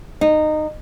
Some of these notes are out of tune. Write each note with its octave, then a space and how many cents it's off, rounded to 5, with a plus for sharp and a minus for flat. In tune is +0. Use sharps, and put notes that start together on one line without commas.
D#4 -20